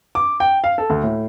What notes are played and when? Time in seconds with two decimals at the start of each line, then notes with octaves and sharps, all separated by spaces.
0.15 D6
0.40 G5
0.64 F5
0.78 A4
0.90 D2
1.03 A2